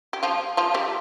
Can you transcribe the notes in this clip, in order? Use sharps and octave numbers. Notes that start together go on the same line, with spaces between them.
G4
F3 F4
F3 F4
G3 G4